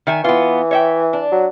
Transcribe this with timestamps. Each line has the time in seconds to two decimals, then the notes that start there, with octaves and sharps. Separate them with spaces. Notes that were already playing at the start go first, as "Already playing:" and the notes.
0.07 D#3 E5 G#5
0.24 E3 B3 F4
0.71 C#5 E5 G5
1.13 D4
1.32 F#3